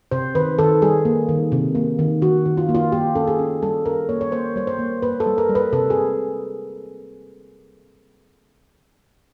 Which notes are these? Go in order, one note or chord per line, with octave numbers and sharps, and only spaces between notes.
C3 C5
D#3 B4
D#3 A4
G3 G#4
A#3
D#3
C3
A#3
D#3
D#3 F#4
D#3
F4
A#3
F4
A#3 G4
C#4 A4
G#4
C#4
G3 A4
C#4 A#4
A#3 C#5
C#5
A#3 C5
G3 C#5
C5
A#3
A#3 B4
A4
G3
A#4
G3
B4
C3 A4
G#4